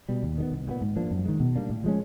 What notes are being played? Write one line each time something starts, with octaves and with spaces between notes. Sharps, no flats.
B2 G3
D#2
D#3 G3 B3
C2
A#2 G3 B3
G#2
F3 A#3 D4
F#2
D#3 G#3
B2
G3 A#3 D4
A2
F3 G#3 C#4